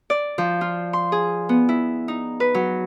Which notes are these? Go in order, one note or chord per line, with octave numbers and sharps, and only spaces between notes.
D5
F3
F4
C6
G#4
B3
E4
D#4
B4
F#3